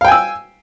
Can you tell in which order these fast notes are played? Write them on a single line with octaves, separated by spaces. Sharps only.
F5 G5 G#5 E6